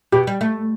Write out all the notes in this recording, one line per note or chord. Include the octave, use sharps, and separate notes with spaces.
B2 G4
G3
A3